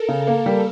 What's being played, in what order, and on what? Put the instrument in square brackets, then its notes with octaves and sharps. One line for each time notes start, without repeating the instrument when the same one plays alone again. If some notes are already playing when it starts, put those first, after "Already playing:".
Already playing: [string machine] A4 A#4
[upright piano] C#3
A#3
G3